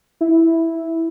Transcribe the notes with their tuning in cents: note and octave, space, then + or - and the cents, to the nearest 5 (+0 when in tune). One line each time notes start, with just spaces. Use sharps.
E4 -5